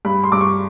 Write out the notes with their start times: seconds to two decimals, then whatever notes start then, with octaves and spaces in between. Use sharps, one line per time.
0.05 G2 B5
0.24 C6
0.32 G2 D6
0.41 C#6